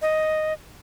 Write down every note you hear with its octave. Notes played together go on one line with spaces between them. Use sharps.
D#5